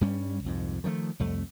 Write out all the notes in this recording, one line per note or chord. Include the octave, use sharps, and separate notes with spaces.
G2 G3 C#4
C2 F2 G#2
D#3 F3 F#3 A3
C2 F2 A3